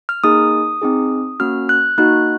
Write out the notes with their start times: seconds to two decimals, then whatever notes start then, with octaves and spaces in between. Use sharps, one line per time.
0.09 F6
0.24 A#3 D#4 G#4 D#6
0.82 C4 D#4 G#4
1.40 A#3 C#4 F#4 F6
1.69 F#6
1.98 A#3 D#4 F#4 F#6